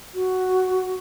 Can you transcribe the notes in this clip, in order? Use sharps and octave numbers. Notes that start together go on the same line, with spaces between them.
F#4